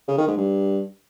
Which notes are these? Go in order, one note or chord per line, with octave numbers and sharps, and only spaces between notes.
C#3
D#3
G#2
G2